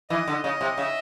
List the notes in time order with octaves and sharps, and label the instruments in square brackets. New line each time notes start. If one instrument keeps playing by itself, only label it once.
[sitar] E3 [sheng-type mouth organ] D#5
[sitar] D3
[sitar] C#3 [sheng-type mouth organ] D#5
[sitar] C3
[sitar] C#3 [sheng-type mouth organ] E5